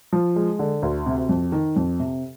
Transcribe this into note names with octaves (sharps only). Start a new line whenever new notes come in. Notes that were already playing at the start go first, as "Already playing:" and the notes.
F3
G#3
D3
D2
C3
F2
D#3
F2
C3